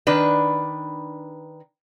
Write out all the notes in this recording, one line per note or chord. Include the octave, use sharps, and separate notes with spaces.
D#3 D4 B4